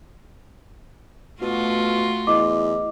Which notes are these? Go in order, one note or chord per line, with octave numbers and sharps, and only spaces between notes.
B2 A3 F4 F#4
E2 D#5 D6